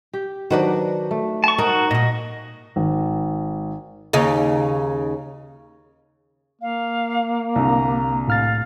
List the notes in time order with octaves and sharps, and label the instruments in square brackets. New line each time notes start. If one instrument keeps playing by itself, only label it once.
[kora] G4
[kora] D#3 F#3 D4 [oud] F#4 B4 D5
[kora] A3
[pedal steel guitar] A5 C#6
[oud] D#4 [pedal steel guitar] F#4 [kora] A#4
[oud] A#2 F#4 [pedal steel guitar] D#5
[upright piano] G#1
[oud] D#2 C#3 D#4
[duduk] A#3 [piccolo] F5
[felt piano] C2 D3 [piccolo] A#5
[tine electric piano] A2 F6 A6 [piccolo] F5